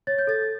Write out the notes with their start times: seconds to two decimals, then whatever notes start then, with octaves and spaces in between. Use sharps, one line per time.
0.07 C#5 A6
0.18 G6
0.27 A4 A6